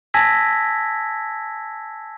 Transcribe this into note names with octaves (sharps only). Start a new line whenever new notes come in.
G#5 A5 E6 G#6 A#6 B6